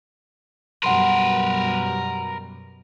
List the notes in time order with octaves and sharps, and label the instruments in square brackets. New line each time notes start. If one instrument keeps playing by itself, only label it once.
[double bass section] F#2 B2 G3 [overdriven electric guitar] A#4 B4 [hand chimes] F#5 C6